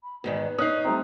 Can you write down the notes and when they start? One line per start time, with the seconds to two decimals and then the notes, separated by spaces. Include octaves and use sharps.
0.03 B5
0.24 E2 G#2 D#3 B4
0.58 C#4 D#4 D#6 F#6 C7
0.85 G3 A3 C4 A#5